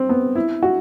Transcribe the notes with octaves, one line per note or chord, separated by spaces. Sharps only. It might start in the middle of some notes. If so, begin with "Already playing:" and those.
Already playing: C4
B3
E4
F#4